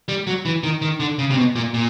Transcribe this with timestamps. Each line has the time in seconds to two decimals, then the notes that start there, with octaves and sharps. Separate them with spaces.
0.08 G3
0.27 F#3
0.45 E3
0.63 D#3
0.82 D#3
1.00 D3
1.19 C#3
1.30 C3
1.37 B2
1.55 A#2
1.74 A#2